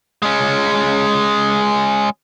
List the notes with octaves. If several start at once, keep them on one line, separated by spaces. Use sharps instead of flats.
G#3 C#4